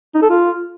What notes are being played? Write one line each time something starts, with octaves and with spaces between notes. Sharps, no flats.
D#4
A4
F4